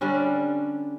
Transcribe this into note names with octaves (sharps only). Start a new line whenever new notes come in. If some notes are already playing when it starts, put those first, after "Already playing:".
D3 G3 C#4 D4